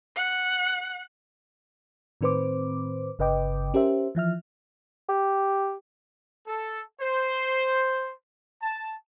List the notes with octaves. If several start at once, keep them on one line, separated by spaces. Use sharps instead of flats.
F#5
A2 D#3 C4 B4 C5 D6
G1 C#3 B4 D#5 G5 D6
C#4 G4 A#4 C5 E5
E3 F3 E5 F6
G4
A4
C5
A5